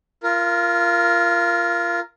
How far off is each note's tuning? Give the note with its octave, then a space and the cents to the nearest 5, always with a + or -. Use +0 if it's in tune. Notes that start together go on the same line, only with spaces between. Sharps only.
F4 -20 A#4 +0